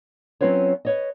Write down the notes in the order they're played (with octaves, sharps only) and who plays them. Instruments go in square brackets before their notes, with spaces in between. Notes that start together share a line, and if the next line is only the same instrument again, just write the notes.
[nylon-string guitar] F#3 C4 C#4 F4 B4 C#5
B4 C#5 D#5